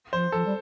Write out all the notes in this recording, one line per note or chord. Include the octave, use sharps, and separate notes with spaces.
F3 C5
F3 A4
G3